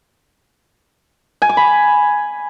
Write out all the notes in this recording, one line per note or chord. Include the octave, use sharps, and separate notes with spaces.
G#5
D6
B5